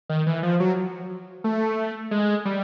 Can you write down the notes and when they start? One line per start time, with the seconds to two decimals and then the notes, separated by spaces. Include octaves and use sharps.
0.10 D#3
0.27 E3
0.43 F3
0.60 F#3
1.44 A3
2.11 G#3
2.45 G3